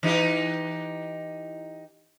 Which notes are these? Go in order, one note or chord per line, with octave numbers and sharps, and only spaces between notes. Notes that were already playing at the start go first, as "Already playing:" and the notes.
E3 D#4 G4